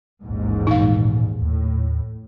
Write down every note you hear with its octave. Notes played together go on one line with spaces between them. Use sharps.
A1 D#2 G#2
A#2 D#4 F5
D#2 A2